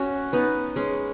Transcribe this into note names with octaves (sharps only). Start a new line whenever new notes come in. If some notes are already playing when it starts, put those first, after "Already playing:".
Already playing: C#4 F#4
B3 D#4
G#3 C#4